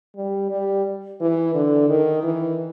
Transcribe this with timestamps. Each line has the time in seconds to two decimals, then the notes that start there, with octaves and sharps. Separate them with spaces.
0.16 G3
0.51 G3
1.20 E3
1.54 D3
1.89 D#3
2.23 E3